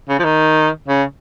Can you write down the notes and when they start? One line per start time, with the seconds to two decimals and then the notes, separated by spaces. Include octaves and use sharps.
0.09 C#3
0.19 F3
0.24 D#3
0.88 C#3